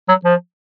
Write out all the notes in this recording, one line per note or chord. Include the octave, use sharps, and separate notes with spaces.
F#3
F3